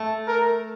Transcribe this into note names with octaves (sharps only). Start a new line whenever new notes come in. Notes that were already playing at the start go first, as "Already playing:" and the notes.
Already playing: A3
A#4